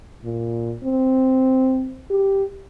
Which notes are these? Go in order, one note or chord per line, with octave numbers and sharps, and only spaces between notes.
A#2
C4
G4